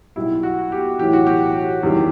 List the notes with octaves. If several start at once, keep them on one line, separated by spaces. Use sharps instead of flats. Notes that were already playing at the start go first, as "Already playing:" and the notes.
B1 B2 G3 E4
F#4
G4
B1 A2 E3 G4
F#4
G4
F#1 E2 D#3 G3